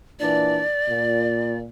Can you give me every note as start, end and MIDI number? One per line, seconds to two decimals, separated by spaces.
0.20 0.63 46
0.20 0.63 52
0.20 0.63 62
0.20 1.57 74
0.87 1.67 46